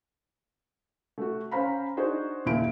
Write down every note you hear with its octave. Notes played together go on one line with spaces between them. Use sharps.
A3 F#4
C#4 C5 F5 A#5 B5
D4 D#4 F#4 G#4 C5 D#5
F#1 D#2 A#2 E4 D7